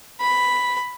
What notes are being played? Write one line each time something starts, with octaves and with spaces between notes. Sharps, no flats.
B5